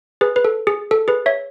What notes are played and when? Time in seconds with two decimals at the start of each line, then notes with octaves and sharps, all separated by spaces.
0.21 G#4 B4
0.36 B4
0.45 A4
0.67 G#4
0.91 A4
1.08 G#4 B4
1.26 C#5 E5